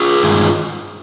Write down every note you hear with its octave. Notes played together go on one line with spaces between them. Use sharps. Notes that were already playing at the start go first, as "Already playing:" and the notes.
Already playing: F4 G#4
G2 D#3 G#3